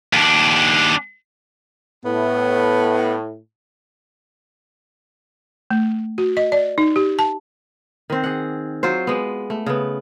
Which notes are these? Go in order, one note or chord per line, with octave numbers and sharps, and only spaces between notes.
D#2 D4
A2 B3
A3
F#4
D#5
D5
D#4
G4
A5
D#3 C4
G#4 F#5
F#3 F4 C5
G#3 B3
A3
C#3 B3